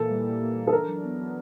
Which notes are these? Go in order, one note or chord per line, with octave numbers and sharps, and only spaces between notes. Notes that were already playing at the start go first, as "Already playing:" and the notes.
Already playing: A#2 E3 A#3 A4
G3
E3
A#3
E3
A4
D4 A#4
F#3
B3
F#3